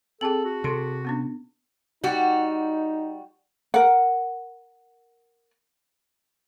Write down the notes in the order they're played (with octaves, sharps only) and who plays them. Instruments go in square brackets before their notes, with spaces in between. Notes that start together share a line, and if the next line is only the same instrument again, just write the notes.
[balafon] C4 G5 [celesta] G#4 A5 F#7 [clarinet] A4
[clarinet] F#4
[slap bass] C3 [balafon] A4 C6
[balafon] B3 C#4 D4
[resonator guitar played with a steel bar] G3 F#4 [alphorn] D#4
[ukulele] A#4 F#5